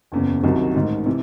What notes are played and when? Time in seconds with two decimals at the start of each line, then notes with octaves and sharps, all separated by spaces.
0.12 F#1 E2 C#3
0.43 C2 C3 D#3 F#3
0.74 A1 G#2 D#3
1.06 C3 E3